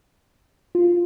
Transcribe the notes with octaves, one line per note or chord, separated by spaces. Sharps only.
F4